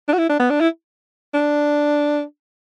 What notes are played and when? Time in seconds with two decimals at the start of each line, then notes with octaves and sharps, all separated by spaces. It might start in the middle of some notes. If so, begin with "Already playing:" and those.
0.08 D4
0.14 F#4
0.18 E4
0.30 D4
0.40 B3
0.50 D4
0.60 E4
1.34 D4